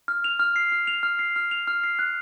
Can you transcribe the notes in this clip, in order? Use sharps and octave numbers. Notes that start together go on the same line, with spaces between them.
F6
F7
F6
C7
F6
F7
F6
C7
F6
F7
F6
C7
F#6